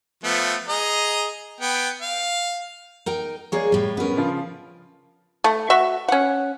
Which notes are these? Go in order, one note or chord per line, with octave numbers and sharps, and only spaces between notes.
F3 A3 B3
G#4 D#5 A#5
B3 G5
F5
D#4 A#4 G5
G#3 A#3 G#4 C#5 D5
A2 G3
B3 C#4 A#4 B4
C#3 F3 F4
A3
F#4 E5 C#6
C#4 F#5